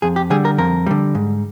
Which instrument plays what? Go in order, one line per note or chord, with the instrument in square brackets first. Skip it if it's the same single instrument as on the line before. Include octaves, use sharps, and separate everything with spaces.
[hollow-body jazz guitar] F2 G#4
G4
D3 G3 G#4
A#4
F2 A#4
D3 G3
G#2